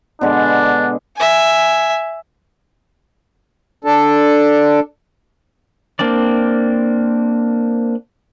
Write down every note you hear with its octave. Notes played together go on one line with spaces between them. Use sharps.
B2 D3 G#3 D4
E5 G#5
D4 A4
A#3 C4 D4 D5